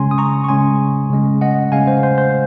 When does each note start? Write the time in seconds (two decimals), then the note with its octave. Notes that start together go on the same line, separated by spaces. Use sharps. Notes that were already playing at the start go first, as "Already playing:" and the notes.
Already playing: C#3 G#3 C#4 G#5 C6
0.11 D#6
0.18 A#5 C#6
0.44 C#6
0.49 C#3 G#3 C#4 G#5 C6
1.10 C#3 G#3 C#4
1.41 D#5 F#5
1.72 C#3 G#3 C#4 F5 G#5
1.88 C5
2.03 C5
2.18 C5